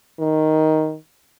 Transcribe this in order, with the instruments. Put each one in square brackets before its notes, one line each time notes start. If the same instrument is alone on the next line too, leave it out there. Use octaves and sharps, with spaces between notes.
[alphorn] D#3